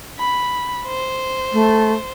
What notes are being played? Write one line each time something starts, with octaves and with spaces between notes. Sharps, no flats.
B5
C5
A3